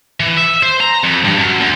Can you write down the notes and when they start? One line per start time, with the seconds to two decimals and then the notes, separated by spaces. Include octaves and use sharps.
0.20 E3
0.37 E5
0.63 C5
0.80 A#5
1.04 F2
1.24 G2
1.39 F#2
1.60 D2